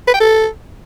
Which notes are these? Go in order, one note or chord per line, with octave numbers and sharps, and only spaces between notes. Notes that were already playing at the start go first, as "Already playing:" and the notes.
B4
G5
A4